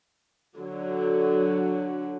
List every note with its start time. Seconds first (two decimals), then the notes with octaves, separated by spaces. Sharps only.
0.57 D3 F#3